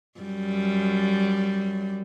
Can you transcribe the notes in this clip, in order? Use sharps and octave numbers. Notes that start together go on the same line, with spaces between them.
F#2 G3